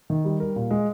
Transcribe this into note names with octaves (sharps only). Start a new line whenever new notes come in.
D#3
G3
A#4
A#2
G#3